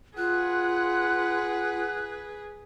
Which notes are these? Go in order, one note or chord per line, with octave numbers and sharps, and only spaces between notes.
F4 G#4 B4 F#5 F#6